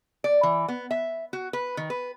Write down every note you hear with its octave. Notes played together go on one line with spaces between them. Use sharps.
D5
E3
B3
E5
F#4
B4
D#3
B4